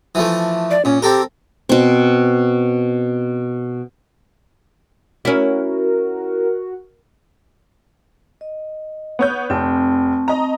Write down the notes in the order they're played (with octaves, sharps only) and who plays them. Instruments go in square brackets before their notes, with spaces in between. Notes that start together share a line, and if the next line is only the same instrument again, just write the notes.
[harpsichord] E3 F3 A3
[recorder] D5
[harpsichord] A#2 [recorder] C#4
[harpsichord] C4 A4 A#4 [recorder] G4
[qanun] B2 C4
[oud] C#4 E4 [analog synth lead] F#4 [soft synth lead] A#4
[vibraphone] D#5
[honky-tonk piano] B3 C#5 G6
[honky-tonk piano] F1 [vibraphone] C4 A5 C#6
[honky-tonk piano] D#5 A#5